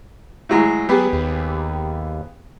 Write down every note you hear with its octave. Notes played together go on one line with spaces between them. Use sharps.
A2 F#3 G#3
F#3 B3 G4 G#4
D#2